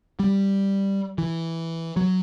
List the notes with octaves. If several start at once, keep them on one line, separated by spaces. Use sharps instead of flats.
G3
E3
F#3